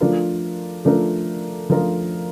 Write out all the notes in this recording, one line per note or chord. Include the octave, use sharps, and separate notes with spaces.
F3 A3 D4 F4 A#4
F3 A3 D4 F4 A#4
F3 A3 D4 F4 A#4